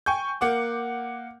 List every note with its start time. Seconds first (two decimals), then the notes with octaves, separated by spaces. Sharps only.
0.06 G5 G#5 C#6 G6
0.41 A#3 F#5 D6